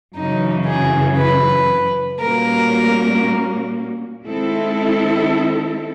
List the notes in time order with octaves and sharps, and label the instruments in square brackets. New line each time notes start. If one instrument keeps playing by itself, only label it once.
[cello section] F#2 C#3 E3 [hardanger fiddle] D#4
[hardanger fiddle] G#4
B4
[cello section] A#2 G3 A#3 C#4 F#4 [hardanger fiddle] A#4
[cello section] D#3 G#3 C4 E4 A4